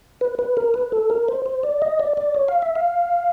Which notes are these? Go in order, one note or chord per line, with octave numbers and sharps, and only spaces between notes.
B4
B4
A#4
B4
A4
A#4
C5
C5
D5
D#5
D5
D5
C#5
F5
E5
F5